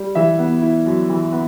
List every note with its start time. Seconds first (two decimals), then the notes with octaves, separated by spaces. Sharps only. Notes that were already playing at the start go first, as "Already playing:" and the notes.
Already playing: G3
0.15 E3 E5
0.38 B3
0.62 E4
0.86 F#2
1.09 E3
1.32 B3